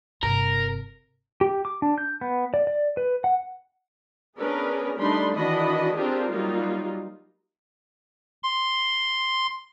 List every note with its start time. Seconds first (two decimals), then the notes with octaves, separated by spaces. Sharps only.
0.23 G1 C3 A#4
1.41 G4
1.65 D6
1.82 D4
1.98 G6
2.21 B3
2.54 D5
2.67 D5
2.97 B4
3.24 F#5
4.37 B3 C#4 D4 G#4 A#4 B4
4.97 G3 A3 D4 D#4 B5 C6
5.35 D#3 E3 D4 F#4 D#5 B5
5.95 C4 D4 F4 G4 G#4 A#4
6.29 F#3 G3 A#3 D#4 F4
8.43 C6